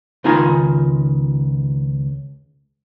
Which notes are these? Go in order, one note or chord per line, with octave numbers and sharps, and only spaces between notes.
C#2 D#3 D#4 F4 G#5 A#5